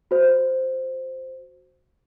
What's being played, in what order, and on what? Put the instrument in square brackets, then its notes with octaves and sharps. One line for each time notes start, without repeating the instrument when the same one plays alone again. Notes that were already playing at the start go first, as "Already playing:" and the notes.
[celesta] F#4 C5